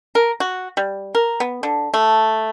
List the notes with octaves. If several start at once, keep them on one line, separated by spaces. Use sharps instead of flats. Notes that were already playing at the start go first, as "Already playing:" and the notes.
A#4
F#4
G3
A#4
B3
D3
A3